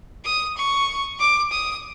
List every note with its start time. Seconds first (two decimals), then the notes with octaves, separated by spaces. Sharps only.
0.25 D#6
0.57 C#6
1.19 D6
1.51 D#6